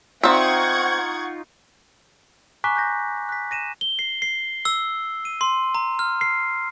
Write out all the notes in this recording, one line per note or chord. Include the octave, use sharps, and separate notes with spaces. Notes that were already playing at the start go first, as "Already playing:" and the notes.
C4 D#4 F4 E5 F#5 C#6 G#6
G#5 A#5 C#6 D6 F#6 B6
F#6 G6 A#6
F#6 B6
A#6 D#7 E7
G7
C7
C7
E6
D#7
C6
A#5
F6
C7